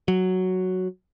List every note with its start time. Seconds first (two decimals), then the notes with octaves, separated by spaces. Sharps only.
0.08 F#3